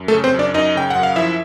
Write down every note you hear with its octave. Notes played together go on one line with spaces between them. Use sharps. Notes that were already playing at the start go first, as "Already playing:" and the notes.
Already playing: F#2
A3 A4
C#3
C4 C5
F#2 D4 D5
F#2 D#4 D#5
C#3 G5
F#2 F#5
F5
F3 E4 E5